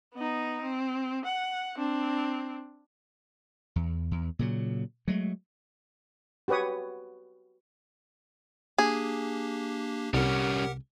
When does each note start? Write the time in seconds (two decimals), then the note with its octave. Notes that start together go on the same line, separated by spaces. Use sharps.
0.14 B3 D#4
0.62 C4
1.25 F#5
1.77 C4 D4
3.76 E2
4.11 E2
4.39 A#2 C#3 F#3
5.08 F#3 G#3 A3
6.48 F#4 G4 B4 C#5 D#6
8.78 A#3 D4 G4 G#4
10.14 C2 G3 C#4 G4 A#4 F#5